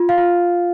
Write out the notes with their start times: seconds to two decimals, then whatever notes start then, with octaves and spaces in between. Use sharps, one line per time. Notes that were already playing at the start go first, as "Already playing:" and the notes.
Already playing: F4
0.09 F5
0.18 F4